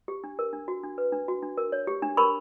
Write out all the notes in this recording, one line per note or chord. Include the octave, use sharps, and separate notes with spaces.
G4
D4
A#4
D4
F#4
D4
B4
D4
F#4
D4
A#4
C#5
G4
D4
A#4 B5 C#6